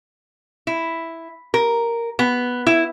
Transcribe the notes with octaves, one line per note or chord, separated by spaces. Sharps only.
E4
A#4
B3
E4